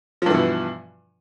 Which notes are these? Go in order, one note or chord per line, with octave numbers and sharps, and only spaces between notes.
G2 B2 E3 F3